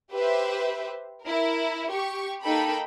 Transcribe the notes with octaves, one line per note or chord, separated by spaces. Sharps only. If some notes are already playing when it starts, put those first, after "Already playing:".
G4 B4 C5 E5
E4 A#4
G4 C#6
A#3 D#4 A4 G5 A5 B5